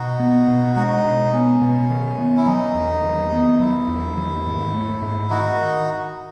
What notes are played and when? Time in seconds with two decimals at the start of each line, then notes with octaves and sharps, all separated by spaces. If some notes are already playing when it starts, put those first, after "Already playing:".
Already playing: B2 D#4 F#4
0.20 B3
0.48 B2
0.76 G#3 D#4
1.05 B2
1.33 B3 C#4
1.62 B2
1.90 D#3
2.18 B3
2.37 E4
2.46 F#3 D#4
2.75 E2
3.04 D#3
3.32 B3
3.60 F#3 E4
3.88 E2
4.17 D#3
4.46 G#2
4.74 A3
5.02 G#2
5.30 D#3 D#4 F#4